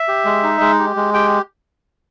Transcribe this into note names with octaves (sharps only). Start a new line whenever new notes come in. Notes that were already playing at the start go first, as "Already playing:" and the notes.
Already playing: E5
G4
G#3
D#4
G#3
G4
G#3
G4 G5